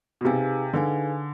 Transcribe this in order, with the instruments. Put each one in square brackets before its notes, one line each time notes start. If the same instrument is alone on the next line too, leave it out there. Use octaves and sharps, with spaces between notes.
[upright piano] B2
[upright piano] C3 [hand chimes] D#4 G#4 B4 F5 G#5
[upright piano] D3 [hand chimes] D#4 G#4 B4 F5 G#5